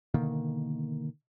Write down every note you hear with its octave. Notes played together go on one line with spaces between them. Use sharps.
B2 D3 D#3 A#3